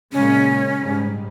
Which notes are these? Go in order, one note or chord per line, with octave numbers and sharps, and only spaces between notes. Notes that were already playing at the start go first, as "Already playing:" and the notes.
A#2 C#3 G#3 C#4
G#2 G3